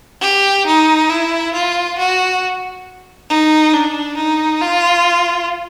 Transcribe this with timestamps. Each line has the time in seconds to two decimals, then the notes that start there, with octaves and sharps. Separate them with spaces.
0.22 G4
0.67 D#4
1.10 E4
1.54 F4
1.98 F#4
3.29 D#4
3.74 D4
4.17 D#4
4.62 F4